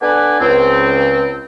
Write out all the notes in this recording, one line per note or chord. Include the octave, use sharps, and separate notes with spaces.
B3 D4 A4 B4 D5 G#5
C#2 C4